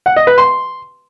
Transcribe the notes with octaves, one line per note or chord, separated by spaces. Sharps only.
F#5
D#5
B4
C6